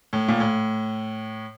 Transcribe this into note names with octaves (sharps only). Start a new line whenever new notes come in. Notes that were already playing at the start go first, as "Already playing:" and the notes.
A2
A#2
A2